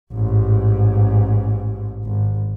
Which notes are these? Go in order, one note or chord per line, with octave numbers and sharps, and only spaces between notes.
A1 G#2
G#1